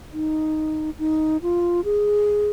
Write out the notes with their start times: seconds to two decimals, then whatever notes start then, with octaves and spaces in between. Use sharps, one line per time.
0.13 D#4
0.99 D#4
1.42 F4
1.85 G#4